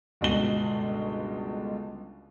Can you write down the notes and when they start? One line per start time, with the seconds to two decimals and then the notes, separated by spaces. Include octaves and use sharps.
0.21 G1 C#2 B2 G7